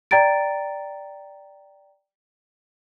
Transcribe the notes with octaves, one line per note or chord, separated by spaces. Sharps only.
D5 G5 A#5 A6 D7